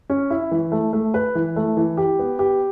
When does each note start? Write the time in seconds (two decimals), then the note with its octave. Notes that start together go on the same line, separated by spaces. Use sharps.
0.10 C#4
0.30 E4
0.51 E3
0.72 A3
0.93 A3
1.14 B4
1.35 E3
1.56 A3
1.77 E3
1.97 G4
2.19 B3
2.39 G4